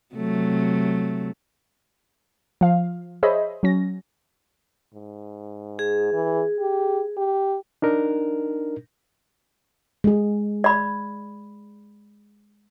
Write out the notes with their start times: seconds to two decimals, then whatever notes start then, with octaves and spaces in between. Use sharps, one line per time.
0.15 C3 F#3 A3
2.61 F3 F5
3.23 G#4 C5 C#5 D#5 E5 B5
3.63 F#3 C#4 A#6
4.95 G#2
5.79 G#4
6.13 E3
6.60 G4
7.17 G4
7.82 D4 D#4 A#4
10.04 G#3 G#4
10.64 D5 B5